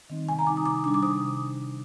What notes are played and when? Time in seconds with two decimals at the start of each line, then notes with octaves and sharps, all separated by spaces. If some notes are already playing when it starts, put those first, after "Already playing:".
0.10 D#3 G3 C4 D#4
0.28 C3 G#5
0.39 A#5
0.47 D#3 G3 C4 D#4 D6
0.57 D#6
0.66 C3 D6
0.84 G3 D4 D6
0.94 D6
1.03 C3 D#6